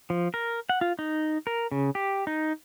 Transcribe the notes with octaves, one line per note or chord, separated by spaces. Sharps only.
F3
A#4
F#5
F4
D#4
A#4
C#3
G4
D#4